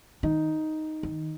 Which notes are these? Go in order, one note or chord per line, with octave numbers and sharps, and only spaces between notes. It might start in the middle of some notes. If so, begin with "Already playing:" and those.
D#3 D#4
D#3